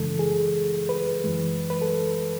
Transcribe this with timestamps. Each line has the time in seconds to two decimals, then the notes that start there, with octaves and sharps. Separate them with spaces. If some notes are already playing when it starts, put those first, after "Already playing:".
Already playing: F#2 C#3 E3 G#3 A4
0.19 G#4
0.89 B4
1.24 F#2 E3 G#3
1.70 B4
1.82 A4